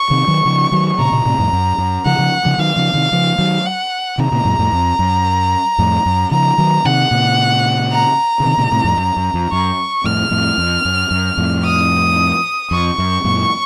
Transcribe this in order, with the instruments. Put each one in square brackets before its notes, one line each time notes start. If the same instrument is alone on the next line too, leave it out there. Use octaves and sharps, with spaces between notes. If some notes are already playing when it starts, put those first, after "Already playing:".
Already playing: [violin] C#6
[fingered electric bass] C3 D#3
D#3 F#3
C#3 F3
D#3 F#3
[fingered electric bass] A#2 C#3 [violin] A#5
[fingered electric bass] A#2 C#3
A2 C3
F2 A2
F#2
F#2
[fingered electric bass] C#3 F3 [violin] F#5
[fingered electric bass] C#3 F3
C#3 F3
[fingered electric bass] D#3 F#3 [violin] F5
[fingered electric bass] C#3 F3
C3 D#3
C#3 F3
D#3 F#3
[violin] F#5
[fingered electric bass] C3 D#3 [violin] A#5
[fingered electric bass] A#2 C#3
F#2 A#2
F2 A2
F2
F#2
F2 A2
F#2
[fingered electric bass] C#3 F3 [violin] A#5
[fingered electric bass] D#3 F#3
[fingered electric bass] C3 D#3 [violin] F#5
[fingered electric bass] A#2 C#3
[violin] A#5
[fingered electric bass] C#3
C3 D#3
A#2 C#3
A2 C3
F2 A2
F#2
F#2
F2
[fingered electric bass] F#2 [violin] C#6
[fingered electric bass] F2 A2 [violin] F6
[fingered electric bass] F2 A2
F2
F#2
F#2
F2 A2
[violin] D#6
[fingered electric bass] F2 [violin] C#6
[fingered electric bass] F#2
F#2 A#2